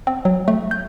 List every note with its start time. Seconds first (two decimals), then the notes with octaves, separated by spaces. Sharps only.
0.07 C4
0.25 F#3
0.48 A3
0.71 G6